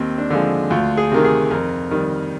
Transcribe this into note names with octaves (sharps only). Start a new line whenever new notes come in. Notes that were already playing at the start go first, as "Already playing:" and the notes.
Already playing: D#2 C4
D4
D3 F3 G#3
D2 F4
G#4
C3 D#3 A#4
G#4
F2 A#4
D#3 G3